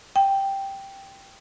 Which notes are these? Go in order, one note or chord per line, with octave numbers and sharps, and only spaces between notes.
G5